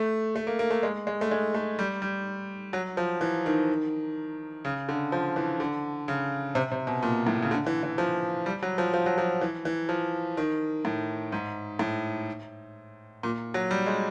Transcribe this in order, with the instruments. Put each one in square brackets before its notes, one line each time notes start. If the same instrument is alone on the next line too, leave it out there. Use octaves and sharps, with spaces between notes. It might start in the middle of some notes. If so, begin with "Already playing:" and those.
Already playing: [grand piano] A3
A3
A#3
A#3
A3
G#3
G#3
A3
G#3
A3
G3
G3
F#3
F3
E3
D#3
C#3
D3
F3
E3
D3
C#3
C3
C3
B2
A#2
A2
C#3
D3
E3
E3
F3
G3
F#3
F3
F3
F#3
F3
E3
E3
F3
D#3
A2
G#2
A2
A#2
F#3
G3
G#3